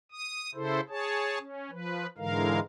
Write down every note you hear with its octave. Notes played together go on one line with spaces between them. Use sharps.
D#6
C#3 E4 A4 C5
G#4 C#5 A5
C#4
F3 B4
G#2 D3 E3 G#3 A#4 F5